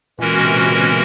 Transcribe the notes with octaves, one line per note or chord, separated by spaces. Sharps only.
A#2 E3 G#3 C#4 F#4 A#4
B2
C3
C#3
C3